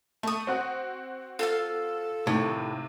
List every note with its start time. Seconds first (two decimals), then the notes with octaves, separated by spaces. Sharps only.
0.23 A3 C#6 D#6
0.47 C4 F#4 F#5
1.39 F4 A4 F5
2.27 A2 C3 D#3